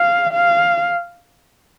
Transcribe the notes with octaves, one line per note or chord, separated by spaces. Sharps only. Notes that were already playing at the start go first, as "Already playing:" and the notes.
Already playing: F5
F5